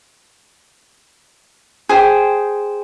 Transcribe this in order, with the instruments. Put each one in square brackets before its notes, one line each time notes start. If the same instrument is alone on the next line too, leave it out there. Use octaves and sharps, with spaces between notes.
[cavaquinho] G#4 C5 G5